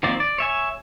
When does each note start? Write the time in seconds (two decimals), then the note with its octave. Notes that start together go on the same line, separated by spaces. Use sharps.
0.03 D#3 F3 A#3 C4 D5
0.20 D5
0.38 C#5 E5 G#5